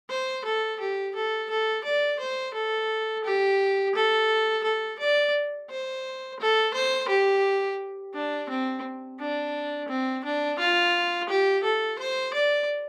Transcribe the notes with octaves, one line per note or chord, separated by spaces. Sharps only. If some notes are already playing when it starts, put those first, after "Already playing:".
C5
A4
G4
A4
A4
D5
C5
A4
G4
A4
A4
D5
C5
A4
C5
G4
D4
C4
D4
C4
D4
F4
G4
A4
C5
D5